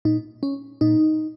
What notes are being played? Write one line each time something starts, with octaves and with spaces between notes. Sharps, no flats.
A#2 D#4
C#4
A#2 D#4